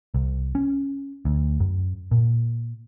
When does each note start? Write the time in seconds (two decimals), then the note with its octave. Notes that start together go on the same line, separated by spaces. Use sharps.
0.14 C2
0.55 C#4
1.25 D2
1.60 F#2
2.11 A#2